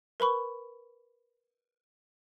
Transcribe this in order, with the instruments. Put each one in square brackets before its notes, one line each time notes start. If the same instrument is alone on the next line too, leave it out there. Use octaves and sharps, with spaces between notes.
[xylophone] A#4 B4 B5 C#6